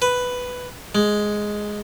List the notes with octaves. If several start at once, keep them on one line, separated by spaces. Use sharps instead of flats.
B4
G#3